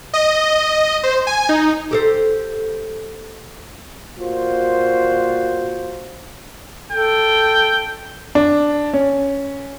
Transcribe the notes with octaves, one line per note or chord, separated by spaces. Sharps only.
D#5
C5
G#5
D#4
G4 A4 C5
A#2 F4 F#4 C5
A4 G5
D4
C#4